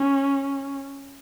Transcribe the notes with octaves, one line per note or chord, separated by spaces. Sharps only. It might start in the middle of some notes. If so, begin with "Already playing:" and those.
Already playing: C#4